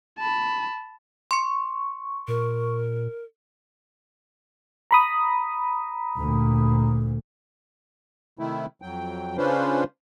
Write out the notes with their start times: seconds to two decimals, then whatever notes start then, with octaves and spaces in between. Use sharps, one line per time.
0.19 A5 B5
1.31 C6 C#6 C#7
2.28 A#2 A#4
4.91 A#5 B5 D#6
6.17 D2 A#2
8.39 C3 D#3 A3 E4
8.82 F2 F#3 G5
9.38 C#3 C#4 D4 F4 B4 C5